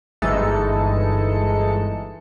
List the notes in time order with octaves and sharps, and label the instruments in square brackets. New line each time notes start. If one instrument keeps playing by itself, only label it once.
[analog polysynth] G1 E3 G#3 D#4 A4 C#7